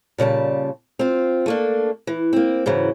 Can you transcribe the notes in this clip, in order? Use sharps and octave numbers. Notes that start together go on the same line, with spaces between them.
A#2 C#3 G3 A5
C4 F4
A3 A#3 D4
E3
A#3 C4
G#2 C#3 E3 F#3